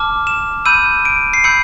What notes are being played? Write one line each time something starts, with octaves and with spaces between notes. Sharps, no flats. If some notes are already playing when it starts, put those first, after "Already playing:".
Already playing: A5 D6 F6
E7
B5 E6 G6 D#7
D7
C7
B5 E6 G6 C#7